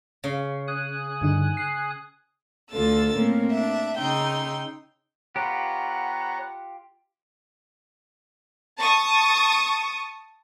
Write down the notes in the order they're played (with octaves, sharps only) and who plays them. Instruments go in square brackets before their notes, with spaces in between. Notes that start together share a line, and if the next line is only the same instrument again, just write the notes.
[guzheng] C#3
[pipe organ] G#5 D#6 F#6
[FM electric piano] G2 D3 D#4
C7
[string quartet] D2 D3 F4 A4 E6 A6
A2 A#3 C4 C#4
D4 E5
C#3 D#4 G5 C6 E6
[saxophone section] B3 F#5 [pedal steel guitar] F4 G4 [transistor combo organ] C#5 A#5
[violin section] A5 C#6 D#6